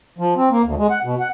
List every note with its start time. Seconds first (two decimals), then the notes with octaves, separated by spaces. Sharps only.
0.19 F3
0.36 C4
0.51 A#3
0.64 D2
0.77 G#3
0.90 F#5
1.04 B2
1.20 F#5